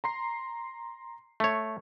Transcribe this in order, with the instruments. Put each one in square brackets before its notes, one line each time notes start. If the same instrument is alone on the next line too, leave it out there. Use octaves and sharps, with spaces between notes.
[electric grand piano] A#5 C6 C7
[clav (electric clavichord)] A3 C#5